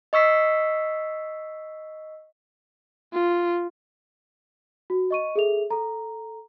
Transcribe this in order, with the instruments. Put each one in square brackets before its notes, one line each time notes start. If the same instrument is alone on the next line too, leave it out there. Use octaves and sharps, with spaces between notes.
[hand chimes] D#5 C#6 E6 B6 C7
[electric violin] F4
[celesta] F#4
D#5 C#6 D#7
G#4 A4 E5 F7
A4 A#5